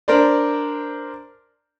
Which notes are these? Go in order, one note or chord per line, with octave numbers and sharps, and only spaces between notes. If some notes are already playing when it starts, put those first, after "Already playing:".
D4 A#4 C5 D5